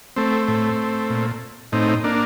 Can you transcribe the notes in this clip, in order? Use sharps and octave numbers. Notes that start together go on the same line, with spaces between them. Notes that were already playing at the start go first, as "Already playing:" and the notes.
A3 C4
A2
A#2
A2 C4 D#4
A#3 D4